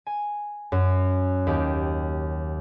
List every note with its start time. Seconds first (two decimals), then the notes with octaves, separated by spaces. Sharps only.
0.07 G#5
0.72 F#2
1.47 D#2 G4